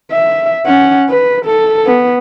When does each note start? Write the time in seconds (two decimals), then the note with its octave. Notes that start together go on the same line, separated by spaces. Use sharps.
0.12 E5
0.66 C#4 F#5
1.09 B4
1.46 A4
1.86 B3